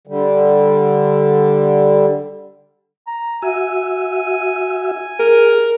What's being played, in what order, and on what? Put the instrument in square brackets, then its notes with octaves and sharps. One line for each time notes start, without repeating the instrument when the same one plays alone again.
[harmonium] D3 G3
[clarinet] A#5
[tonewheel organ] F#4 E5 [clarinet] G#5
[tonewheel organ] G#4 [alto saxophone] A#4